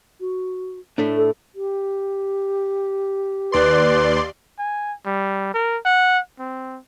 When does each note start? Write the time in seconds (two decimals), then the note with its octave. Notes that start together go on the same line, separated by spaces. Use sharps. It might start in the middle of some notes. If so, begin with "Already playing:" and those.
0.20 F#4
0.98 A2 A3 D4
1.16 A4
1.55 G4
3.52 D#2 B4 D5 C6
4.59 G#5
5.06 G3
5.54 A#4
5.85 F#5
6.39 C4